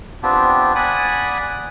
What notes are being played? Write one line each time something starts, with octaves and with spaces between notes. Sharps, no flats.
B3 C4 D4 F4 G4
D5 F#5 G#5 B5 D#6